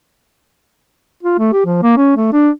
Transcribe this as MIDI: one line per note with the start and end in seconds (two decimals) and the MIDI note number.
1.23 1.38 65
1.39 1.49 57
1.53 1.63 67
1.65 1.81 53
1.83 1.92 58
1.97 2.13 61
2.17 2.32 57
2.33 2.49 62